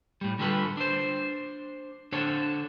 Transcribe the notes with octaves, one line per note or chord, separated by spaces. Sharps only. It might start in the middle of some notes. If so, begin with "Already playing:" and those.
A2 G3
D3 G3 F4 A4 B4
D4 C5
D3 D4 A4 C5 C#5